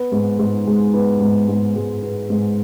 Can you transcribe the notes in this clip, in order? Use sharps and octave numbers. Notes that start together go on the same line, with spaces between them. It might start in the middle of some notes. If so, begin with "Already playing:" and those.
Already playing: B3
G#2
G#2
G#3
B3
G#2
G#2
G#3
B3
G#2